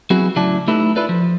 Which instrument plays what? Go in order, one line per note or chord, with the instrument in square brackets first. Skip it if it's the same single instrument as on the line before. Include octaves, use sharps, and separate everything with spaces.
[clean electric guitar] F#3 B3 C4 E4 F#4 G#4
A2 C#3 F#3 E4 D5 A5
A3 D#4 E4 G4 A4 B4
E4 F4 A4 B4 D5
F3